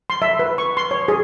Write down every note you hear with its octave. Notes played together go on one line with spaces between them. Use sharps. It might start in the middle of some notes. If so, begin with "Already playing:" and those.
C6
E5
B4
C#6
C6
C#5
G#4